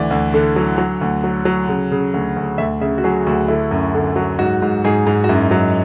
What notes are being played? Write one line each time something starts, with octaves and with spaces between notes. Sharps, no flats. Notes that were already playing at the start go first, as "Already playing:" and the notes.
Already playing: D2 E3 D5
D2
D3
F#3
F#3
D2
F#3
F#3
C#3
C#3
D2
D2
D2 E5
C#3 E5
F#4
F#3 G#4
D2 F#4
D3 E4
F#2
D3
F#3
G#2 F#4
G#2
G#2 G#4
G#2
F#4
F#2 E4
F#3